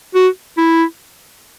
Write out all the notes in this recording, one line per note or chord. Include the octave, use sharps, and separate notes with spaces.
F#4
E4